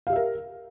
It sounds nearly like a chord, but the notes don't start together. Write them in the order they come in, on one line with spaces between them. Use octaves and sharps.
F5 G4 E5 A#4